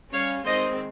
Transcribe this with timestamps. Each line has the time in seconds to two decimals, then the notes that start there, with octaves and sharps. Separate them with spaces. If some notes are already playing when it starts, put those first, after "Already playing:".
0.12 G3 C#4 C#5 F5
0.44 D#3 G#3 C4 C5 D#5